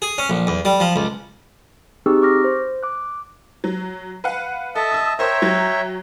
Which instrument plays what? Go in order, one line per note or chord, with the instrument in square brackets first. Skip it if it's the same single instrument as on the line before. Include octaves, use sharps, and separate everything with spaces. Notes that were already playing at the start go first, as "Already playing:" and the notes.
[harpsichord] G#4
C#4
A#1
E2
G3
F3
C#2
[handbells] C4 D#4 G4 G#4 C#6 E6
C#6 D6 F6 A#6
C5
D6 F#6
[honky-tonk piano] F#3
B4 F5 F#5
[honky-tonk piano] A4 [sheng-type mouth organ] D#5 E5 A5
[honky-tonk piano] D#6 E6
[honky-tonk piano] A#4 C5 [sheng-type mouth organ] C#5 E5 G5
[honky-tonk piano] F#3 A#5 G#6